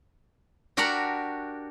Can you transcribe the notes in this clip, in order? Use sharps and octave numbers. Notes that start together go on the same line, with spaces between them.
D4 F#4 G4 A#4 F#5 A#5